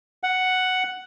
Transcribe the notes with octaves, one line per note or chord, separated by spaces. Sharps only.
F#5